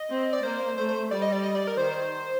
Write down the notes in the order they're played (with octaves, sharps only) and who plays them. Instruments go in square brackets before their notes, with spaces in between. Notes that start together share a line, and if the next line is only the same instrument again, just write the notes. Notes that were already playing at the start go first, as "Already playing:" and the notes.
Already playing: [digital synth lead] D#5
[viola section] C4
[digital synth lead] D5
[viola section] A#3 [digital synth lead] C5
[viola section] A3 [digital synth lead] C5
[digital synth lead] C5
[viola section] G3 [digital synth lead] D5
[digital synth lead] D#5
D5
D#5
D5
A#4
[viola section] D#3 [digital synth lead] C5